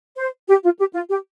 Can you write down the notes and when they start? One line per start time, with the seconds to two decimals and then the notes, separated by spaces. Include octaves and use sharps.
0.16 C5
0.48 G4
0.63 F4
0.78 G4
0.93 F4
1.09 G4